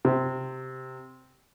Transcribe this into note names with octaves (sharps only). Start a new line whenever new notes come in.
C3